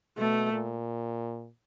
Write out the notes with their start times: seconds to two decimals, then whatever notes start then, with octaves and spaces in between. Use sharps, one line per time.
0.18 B2 A3
0.53 A#2